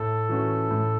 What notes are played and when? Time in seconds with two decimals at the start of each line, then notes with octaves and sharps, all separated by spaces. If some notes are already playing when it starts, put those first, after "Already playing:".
Already playing: A2 A4
0.29 E3 A3 C#4 F#4
0.71 A2